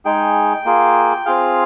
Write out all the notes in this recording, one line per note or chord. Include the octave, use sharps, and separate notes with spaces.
G#3 D#4 G#4 G5
A#3 F4 G#4
C4 F4 G#4 F5